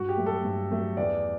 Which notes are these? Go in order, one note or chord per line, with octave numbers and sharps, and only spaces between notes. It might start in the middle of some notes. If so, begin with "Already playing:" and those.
Already playing: G2 F#4
G4
F#3 A3
A4
G2
F#3 A3
E2 D5